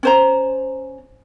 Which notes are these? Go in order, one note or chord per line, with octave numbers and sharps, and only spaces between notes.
C#4 C5 A#5